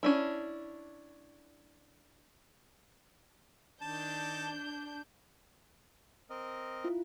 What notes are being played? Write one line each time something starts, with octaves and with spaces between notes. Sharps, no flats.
C#4 D4 E4
D#3 D4 A5 G6
C4 A#4 D#5
E4 F4